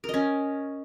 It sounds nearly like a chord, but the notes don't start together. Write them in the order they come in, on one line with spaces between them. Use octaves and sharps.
A#4 D#5 C#4